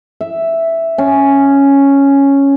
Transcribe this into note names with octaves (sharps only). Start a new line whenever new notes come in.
E5
C#4